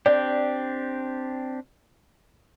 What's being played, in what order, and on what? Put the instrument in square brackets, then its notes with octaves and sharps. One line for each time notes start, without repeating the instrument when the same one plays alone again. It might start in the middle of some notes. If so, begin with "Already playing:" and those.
[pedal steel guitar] C4 D4 G4 [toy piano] D5